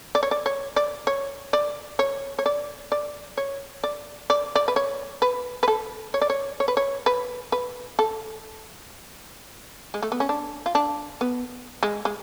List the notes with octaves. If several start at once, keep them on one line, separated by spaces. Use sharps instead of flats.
D5
C#5
D5
C#5
D5
C#5
D5
C#5
C#5
D5
D5
C#5
D5
D5
D5
B4
C#5
B4
B4
A4
C#5
D5
C#5
C#5
B4
C#5
B4
B4
A4
G#3
A3
B3
C#4
D4
F4
D4
B3
G#3
G#3